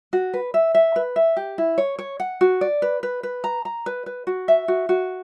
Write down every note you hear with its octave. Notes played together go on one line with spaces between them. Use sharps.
F#4
B4
E5
E5
B4
E5
G4
E4
C#5
C#5
F#5
F#4
D5
B4
B4
B4
A#5
A#5
B4
B4
F#4
E5
F#4
F#4